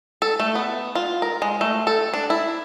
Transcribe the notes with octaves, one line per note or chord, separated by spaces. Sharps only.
A4
A3
B3
F4
A#4
G#3
A3
A4
D4
E4